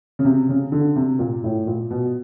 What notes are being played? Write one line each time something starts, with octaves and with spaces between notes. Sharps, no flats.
C#3
C3
C#3
D3
C3
A#2
A2
A#2
B2